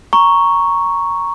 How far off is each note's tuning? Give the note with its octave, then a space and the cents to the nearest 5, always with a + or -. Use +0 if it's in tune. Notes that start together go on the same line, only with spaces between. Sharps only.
A#5 +0 C#6 +0